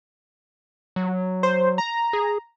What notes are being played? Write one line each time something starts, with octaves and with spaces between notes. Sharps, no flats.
F#3
C5
A#5
G#4